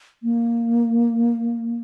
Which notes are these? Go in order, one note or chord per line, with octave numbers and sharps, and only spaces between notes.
A#3